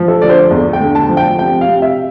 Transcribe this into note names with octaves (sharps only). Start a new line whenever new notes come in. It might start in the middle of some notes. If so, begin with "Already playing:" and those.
Already playing: F3
A4
D3 D5
C5
E2
G5
D3
A5
F3
G5
C3 G5
F5
C3
E5